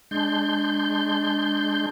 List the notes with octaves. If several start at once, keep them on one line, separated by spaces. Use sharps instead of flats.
G#3 D4 C6 G6